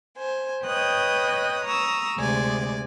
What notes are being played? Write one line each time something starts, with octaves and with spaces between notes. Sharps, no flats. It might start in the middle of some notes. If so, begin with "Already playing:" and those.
C5 G#5
B4 C#5 D#5 G5 D#6 F#6
A#5 C#6 D#6 E6
D2 C3 G#3 D5 G#5